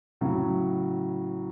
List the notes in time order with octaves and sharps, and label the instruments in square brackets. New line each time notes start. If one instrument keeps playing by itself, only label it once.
[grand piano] A2 C#3 F#3